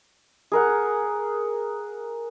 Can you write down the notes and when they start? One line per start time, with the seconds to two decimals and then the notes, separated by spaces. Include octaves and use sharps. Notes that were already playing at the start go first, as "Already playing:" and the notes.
0.52 G#4 A#4 F#5